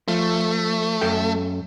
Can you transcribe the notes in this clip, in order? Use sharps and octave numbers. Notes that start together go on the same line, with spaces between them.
F3 A3
F#2 A4 G5